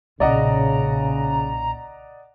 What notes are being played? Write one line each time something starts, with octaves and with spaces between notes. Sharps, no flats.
B1 A#2 C#3 D5 D#5 F#5 A#5